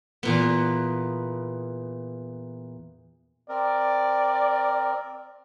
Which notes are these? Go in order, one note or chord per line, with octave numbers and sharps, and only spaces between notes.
E2 A#2 B3
C4 A#4 D5